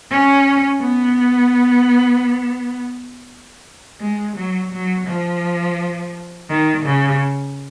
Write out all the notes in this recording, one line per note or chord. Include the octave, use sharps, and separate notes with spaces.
C#4
B3
G#3
F#3
F#3
F3
D#3
C#3